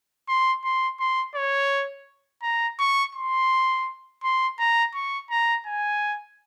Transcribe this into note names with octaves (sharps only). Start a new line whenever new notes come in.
C6
C6
C6
C#5
A#5
C#6
C6
C6
A#5
C#6
A#5
G#5